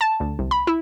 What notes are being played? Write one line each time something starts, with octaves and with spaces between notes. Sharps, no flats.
A5
D2
C2
B5
E4